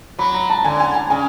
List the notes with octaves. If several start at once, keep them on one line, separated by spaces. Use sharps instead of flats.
F#3 B5
A#5
A5
D3 G#5
G#5
G#5
C#3 G#5